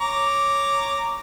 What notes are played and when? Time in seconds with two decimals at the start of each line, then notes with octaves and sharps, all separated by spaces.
0.01 C#5 A#5 D6